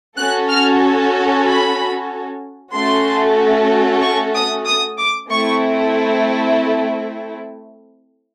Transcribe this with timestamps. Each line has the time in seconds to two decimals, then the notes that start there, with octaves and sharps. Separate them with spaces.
0.17 C#4 F#4 A4 F#6
0.49 F6
1.45 B5
2.73 A3 C#4 F#4 A4 C6
4.01 C#6
4.34 D#6
4.66 D#6
4.98 D6
5.29 A3 C4 E4 C#6